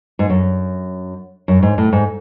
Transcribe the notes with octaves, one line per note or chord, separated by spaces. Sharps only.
G#2
F#2
F#2
G#2
A2
G#2